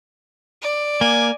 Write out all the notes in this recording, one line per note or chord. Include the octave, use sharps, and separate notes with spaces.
D5
A#3 G#5